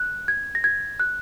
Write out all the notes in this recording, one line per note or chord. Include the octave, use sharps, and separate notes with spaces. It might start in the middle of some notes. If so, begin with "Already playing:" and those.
Already playing: F#6
G#6
A#6
G#6
F#6